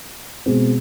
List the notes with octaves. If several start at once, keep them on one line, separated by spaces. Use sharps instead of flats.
B2 G#3 C4